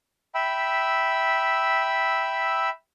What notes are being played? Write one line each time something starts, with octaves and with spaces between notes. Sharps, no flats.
E5 G5 B5 E6